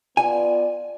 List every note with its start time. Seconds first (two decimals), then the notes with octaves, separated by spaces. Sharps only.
0.17 B3 F4 D5 G#5